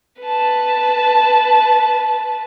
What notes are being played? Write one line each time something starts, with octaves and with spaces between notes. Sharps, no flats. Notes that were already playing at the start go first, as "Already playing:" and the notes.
B4 A5